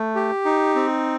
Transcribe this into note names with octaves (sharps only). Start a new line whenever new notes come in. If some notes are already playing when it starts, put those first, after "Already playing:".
Already playing: A3
G4
D#4
C4